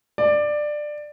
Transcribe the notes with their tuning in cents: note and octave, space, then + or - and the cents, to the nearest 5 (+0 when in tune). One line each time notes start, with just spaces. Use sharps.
D5 +15